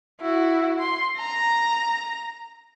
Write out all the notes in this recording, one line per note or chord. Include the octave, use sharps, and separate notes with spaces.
E4 F#4
C6
A#5